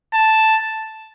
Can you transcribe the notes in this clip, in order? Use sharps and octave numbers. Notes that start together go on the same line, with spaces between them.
A5